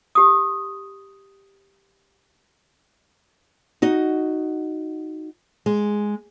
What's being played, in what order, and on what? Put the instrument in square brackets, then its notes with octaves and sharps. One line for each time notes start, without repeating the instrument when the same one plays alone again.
[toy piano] G4 D#6
[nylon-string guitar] D#4 F#4 D#5
G#3